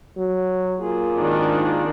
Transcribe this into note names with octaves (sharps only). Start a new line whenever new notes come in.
F#3
A#3 F4 G#4
G#1 D#3 D4